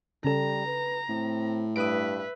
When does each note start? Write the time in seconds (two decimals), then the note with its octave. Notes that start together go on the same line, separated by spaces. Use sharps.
0.24 C#3 G3 C#4 A4 A#5
0.66 B4
1.09 A2 C4
1.76 G2 B4 E5 D#6 D7